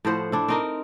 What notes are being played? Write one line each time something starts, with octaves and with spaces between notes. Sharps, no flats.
A2 F3 C5 F#5
D4 E4
C4 D#4 A#4